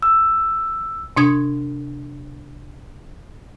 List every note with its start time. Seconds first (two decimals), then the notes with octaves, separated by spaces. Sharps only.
0.02 E6
1.17 C3 D4 D#6 G#6